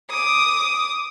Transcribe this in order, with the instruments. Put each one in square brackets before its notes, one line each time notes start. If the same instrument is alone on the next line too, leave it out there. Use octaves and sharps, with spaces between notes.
[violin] D6 D#6